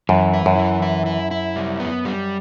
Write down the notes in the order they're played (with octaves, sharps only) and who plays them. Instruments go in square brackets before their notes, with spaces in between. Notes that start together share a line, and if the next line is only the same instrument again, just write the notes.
[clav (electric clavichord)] F#2 [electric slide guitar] E3
[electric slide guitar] E4
[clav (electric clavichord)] F#2
[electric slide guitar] E3
E4
E4
E4
G3
B3
G3